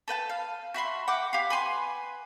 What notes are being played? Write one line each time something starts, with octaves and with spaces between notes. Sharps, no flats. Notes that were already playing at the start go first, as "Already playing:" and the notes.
A4 B4 F#5 A5
F5
F#4 E5 B5 C6
F#5 G5 D6
G4 F5
B4 G#5 C6